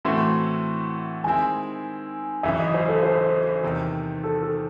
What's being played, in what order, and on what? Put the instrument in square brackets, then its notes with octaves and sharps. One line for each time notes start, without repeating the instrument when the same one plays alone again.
[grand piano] A2 E3 A3 C4 F#4 [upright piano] C6
[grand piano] D#3 G#3 C4 E4 [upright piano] G#5
[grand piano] G#1 F#2 C#3 E3 [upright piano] E5
[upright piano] D#5
C5
A4
C5
[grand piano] E2 C3 D#3
[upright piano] A4
A4